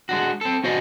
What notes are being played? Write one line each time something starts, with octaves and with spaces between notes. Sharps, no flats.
G#3 D4 F#4
C4 A4
C#4 F#4 C5 D5 D#5